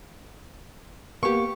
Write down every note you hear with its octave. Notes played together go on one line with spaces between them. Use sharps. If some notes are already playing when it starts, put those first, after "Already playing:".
A#3 B3 G4 C#6